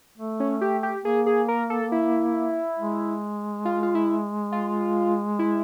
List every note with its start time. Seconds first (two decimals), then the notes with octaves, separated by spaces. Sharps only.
0.18 A3
0.40 C#4
0.61 G4
0.83 G4
1.04 A#3 G#4
1.26 G#4
1.48 A#4
1.70 A4
1.92 E4
2.79 G#3
3.65 F4
3.83 F4
3.95 E4
4.52 F4
5.39 E4